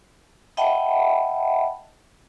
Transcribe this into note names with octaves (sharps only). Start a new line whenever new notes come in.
D#5 E5 F#5 G5 A5 B5